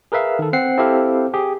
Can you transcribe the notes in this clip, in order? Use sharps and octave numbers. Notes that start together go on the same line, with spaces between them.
G#4 A#4 B4 E5 F5
D#3 A4
C4 F#5 C7
C4 E4 G4 A4 F5
G4 G#4